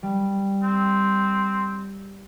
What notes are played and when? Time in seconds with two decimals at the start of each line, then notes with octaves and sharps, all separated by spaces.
0.03 G3
0.63 C4